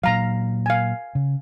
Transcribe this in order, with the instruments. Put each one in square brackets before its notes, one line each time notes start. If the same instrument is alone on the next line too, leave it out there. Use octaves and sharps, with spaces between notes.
[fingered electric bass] A#2 F#3 [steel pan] F5 A#5
[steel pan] F5 G#5
[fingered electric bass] C#3